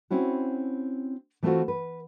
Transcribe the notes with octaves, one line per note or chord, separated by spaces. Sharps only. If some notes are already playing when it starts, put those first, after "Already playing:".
C4 C#4 E4 F#4
E3 A3 B3 C4 F4 F#4
B4